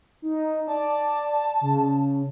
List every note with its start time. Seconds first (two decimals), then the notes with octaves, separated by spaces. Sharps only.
0.22 D#4
0.68 D5 A5
1.61 C#3